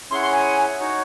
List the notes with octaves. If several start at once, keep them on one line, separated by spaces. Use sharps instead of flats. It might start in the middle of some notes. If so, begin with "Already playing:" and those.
C#4 E4 G#4 C#5 F#5 C6
C6
G#5
D#4 F#4 C#5